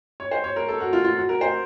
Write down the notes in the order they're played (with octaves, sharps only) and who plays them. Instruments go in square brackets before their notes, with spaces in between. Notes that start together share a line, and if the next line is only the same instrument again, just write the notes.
[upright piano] C#5
C5
C#5
A#4
A4
F#4
F4
F4
F#4
A#4
C5